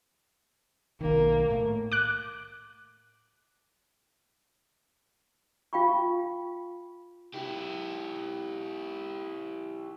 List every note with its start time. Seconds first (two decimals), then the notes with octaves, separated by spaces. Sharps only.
1.01 B1 D#3 A#3
1.50 A2
1.92 D6 F#6
5.73 F4 F5 G5 B5 C#6
7.34 E4 G4